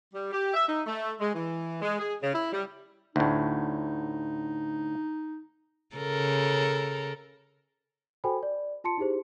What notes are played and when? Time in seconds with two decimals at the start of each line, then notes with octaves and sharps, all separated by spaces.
0.13 G3
0.32 G4
0.54 E5
0.68 D#4
0.86 A3
1.20 G#3
1.35 E3
1.81 G#3
1.99 G#4
2.22 C#3
2.34 E4
2.53 G3
3.16 D2 A2 D#4
5.96 C#3 A4 A#4
8.24 F#4 A4 C5 G5 G#5 B5
8.43 D5
8.84 F4 A5 C6 C#7
8.98 D#4 E4 G4 G#4 C5